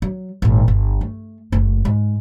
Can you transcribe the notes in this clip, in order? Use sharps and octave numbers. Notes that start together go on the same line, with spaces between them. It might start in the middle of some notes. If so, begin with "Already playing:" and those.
F#3
G#1 A#2
G1
A3
F#1 A3
G#2 G#3